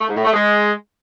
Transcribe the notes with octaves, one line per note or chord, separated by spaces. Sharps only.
A3
G#2
A2
A3
G#3